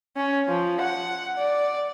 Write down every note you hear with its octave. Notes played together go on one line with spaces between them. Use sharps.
C#4
F3
F#5
D5